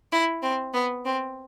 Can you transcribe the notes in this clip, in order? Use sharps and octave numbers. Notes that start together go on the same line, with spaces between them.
E4
C4
B3
C4